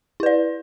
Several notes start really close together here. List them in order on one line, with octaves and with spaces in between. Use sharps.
E4 B4 D5